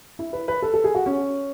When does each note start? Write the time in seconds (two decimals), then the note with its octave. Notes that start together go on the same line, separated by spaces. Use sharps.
0.19 E4
0.33 B4
0.48 B4
0.62 A4
0.74 A4
0.84 G#4
0.95 F#4
1.06 C#4